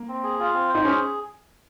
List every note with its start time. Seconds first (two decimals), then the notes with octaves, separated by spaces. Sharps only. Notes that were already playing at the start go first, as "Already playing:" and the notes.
Already playing: A#3
0.08 C4
0.23 G#4
0.40 F4
0.54 C4
0.69 C5
0.75 D#4
0.85 C#4 G#4